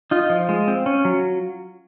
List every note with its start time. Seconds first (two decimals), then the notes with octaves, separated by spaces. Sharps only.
0.11 D#4 F4
0.30 F3
0.49 G#3
0.68 C4
0.86 C#4
1.05 F#3